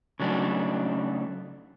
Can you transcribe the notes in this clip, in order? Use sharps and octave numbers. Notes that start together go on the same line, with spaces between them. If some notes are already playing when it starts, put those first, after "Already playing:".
C#3 F#3 A3 D4 D#4